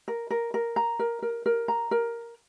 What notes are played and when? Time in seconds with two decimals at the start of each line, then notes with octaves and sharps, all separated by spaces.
0.08 A#4
0.30 A#4
0.54 A#4
0.76 A#5
0.99 A#4
1.22 A#4
1.46 A#4
1.68 A#5
1.91 A#4